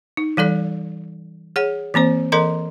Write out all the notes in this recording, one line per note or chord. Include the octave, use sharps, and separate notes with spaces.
D#4
E3 G3 A4 D5
G#4 C#5 F#5
E3 A#3 C4 C5
E3 A4 A#4 D#5 A#5 C6